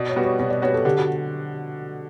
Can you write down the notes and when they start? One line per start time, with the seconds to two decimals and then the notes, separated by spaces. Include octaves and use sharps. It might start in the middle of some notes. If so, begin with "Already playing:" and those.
Already playing: B2 D5
0.08 C#5
0.16 G3 B3 F#4
0.24 C#5
0.39 B2 C#5
0.50 D5
0.62 G3 B3 F#4 C#5
0.74 A4
0.85 D3 G4
0.97 F#4